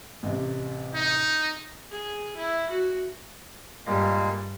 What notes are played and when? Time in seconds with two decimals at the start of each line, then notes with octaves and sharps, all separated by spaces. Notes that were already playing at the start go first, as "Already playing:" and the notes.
0.23 A1 C3
0.94 D#4
1.91 G#4
2.36 E4
2.70 F#4
3.86 G2 A#2 G3 G#3 A#3